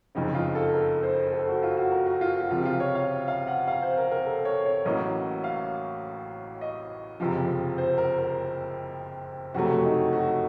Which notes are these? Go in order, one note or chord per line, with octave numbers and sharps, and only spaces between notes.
F#1 F2 C#3 D#4
F4
A4
A#4
C5
A4
F#4
F4
F#4
A#4
F#4
F4
F#4
C#2 C3 F3 C4 F4
F4
C#5
F5
F5
F#5
F5
C5
A#4
A#4
A4
C#5
C#5
A1 A2 F#3 A#3 C#4 D#5
F5
D#5
F#1 F2 C3 F3
C5
A#4
A#4
F#1 F2 C3 F#3 A3 F#4
D#4
F#4